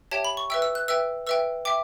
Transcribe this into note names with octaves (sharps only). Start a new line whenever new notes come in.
G4 C#5 E5 G5 A5
B5
C#6
B4 E5 G5 E6
E6
F#6
B4 E5 G5 E6
B4 E5 G5 E6
E5 G5 D6